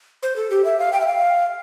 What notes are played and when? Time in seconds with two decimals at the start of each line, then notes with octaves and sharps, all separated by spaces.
0.23 C5
0.36 A4
0.51 G4
0.65 E5
0.79 F5
0.93 G5
1.01 E5
1.07 F5